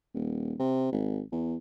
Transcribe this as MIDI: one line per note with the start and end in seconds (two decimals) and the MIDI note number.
0.14 0.54 27
0.59 0.92 48
0.92 1.21 32
1.32 1.56 40